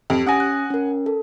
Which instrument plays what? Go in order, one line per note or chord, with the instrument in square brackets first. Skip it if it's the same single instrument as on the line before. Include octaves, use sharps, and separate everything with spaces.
[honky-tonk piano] F2 [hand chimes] G4 D7
[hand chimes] C#4 D#6 A#6 [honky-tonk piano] F#5 G#5
[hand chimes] F#6
C#4 A#4
A4